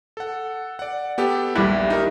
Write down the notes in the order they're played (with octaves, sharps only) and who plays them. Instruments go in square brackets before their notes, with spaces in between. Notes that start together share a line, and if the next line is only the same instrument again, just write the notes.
[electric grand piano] A4 F#5
D5 F#5
B3 G4 A4
[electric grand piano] A#1 D#2 F#6 [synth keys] G3 E4
[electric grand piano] D#4 A#4